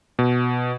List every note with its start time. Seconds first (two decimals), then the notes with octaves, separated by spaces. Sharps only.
0.19 B2